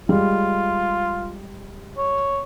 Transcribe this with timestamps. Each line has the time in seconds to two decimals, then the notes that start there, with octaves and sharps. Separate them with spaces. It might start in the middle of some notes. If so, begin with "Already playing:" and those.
0.09 G3 G#3 F4
1.98 C#5